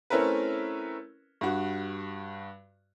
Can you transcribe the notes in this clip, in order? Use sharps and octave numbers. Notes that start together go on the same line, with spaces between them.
A3 C4 C#4 E4 A#4 B4
G2 F#4